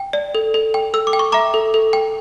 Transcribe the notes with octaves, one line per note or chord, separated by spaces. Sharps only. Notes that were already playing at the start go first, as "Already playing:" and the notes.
Already playing: G5
D5
A4
A4
G5
A4 E6
D6
G5
C#6
E5 A#5 D6
A4
A4
G5